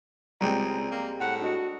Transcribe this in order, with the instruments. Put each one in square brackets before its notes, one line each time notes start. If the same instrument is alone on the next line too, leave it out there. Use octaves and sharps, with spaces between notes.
[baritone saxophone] C#2 [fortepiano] G3 G#3 C4 [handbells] A#5
[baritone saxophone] A#3
[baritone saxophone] A2 [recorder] F#5
[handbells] D4 D#5 C#7 [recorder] F#4